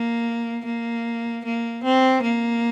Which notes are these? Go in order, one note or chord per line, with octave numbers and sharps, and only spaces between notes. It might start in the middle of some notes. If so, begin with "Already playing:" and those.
Already playing: A#3
A#3
A#3
C4
A#3